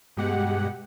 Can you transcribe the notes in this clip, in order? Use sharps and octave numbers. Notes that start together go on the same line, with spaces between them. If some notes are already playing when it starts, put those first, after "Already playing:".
G2 B2 G#3 G4 F#5